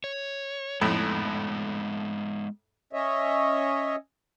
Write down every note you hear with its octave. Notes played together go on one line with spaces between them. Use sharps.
C#5
F2 A2 G#3 B3 D#4
C#4 C#5 D#5 E5